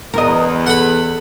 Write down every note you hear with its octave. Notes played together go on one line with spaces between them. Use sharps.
E2 A#4 D#5
A4 F#5 B5